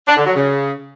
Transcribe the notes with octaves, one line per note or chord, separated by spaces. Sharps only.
D4
D3
F#3
C#3